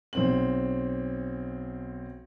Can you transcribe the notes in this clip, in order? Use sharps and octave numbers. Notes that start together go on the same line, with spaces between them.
B1 C4 F#7